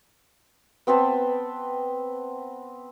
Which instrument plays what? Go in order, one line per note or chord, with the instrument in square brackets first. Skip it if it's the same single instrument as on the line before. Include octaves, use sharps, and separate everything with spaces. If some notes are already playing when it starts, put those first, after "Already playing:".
[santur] B3 C4 B4 A5